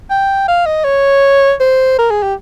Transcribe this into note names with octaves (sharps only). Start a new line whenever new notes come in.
G5
F5
D#5
C#5
C5
A#4
G#4
G4